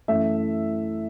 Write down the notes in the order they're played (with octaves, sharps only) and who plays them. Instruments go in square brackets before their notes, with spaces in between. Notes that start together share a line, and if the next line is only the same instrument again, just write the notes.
[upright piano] F#2 E3 A3 E5